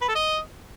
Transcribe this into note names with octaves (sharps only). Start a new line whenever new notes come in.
B4
A4
D#5